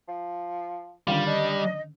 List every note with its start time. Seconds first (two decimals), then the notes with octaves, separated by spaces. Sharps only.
0.08 F3
1.07 D3 D#3 G3 C#4 F4
1.27 D4 D#5